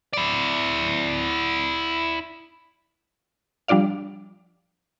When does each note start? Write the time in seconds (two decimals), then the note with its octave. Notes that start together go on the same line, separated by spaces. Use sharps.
0.13 E4 D5
3.68 F3 G3 D4 F4 D5 F5